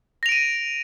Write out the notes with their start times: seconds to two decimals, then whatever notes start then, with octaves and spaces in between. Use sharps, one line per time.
0.23 A#6
0.26 F7
0.29 D7
0.32 D#7